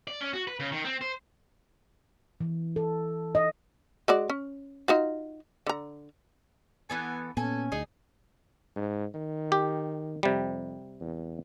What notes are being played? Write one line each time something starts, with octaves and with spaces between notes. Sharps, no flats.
D5
C#4
F#4
B4
C#3
D#3
C4
C5
E3
A4
D#5
G#3 F#4 D5
C#4
D#4 F4 F#4
D3 A#5
E3 B3 A4 G#5
A#2 B3 C#4 A4 G#5
D2 D#4 G#4
G#2
D#3
G4
F2 C3 G3
E2